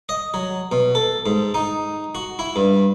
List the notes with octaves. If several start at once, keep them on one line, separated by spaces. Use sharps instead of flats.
D#5
F#3
B2
A4
G#2
D#4
F#4
E4
G2